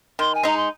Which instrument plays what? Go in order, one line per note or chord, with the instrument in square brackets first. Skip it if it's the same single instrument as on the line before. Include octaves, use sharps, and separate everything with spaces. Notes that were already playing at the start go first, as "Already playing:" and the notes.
[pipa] D#3 [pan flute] C6
[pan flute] G#5
[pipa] G#3 D#4 [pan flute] A#5
[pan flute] C6